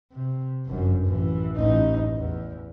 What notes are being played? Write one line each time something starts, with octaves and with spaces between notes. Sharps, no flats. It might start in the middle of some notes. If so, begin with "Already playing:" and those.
C3
G1 F#2
A1 E3
A1 D#4
E2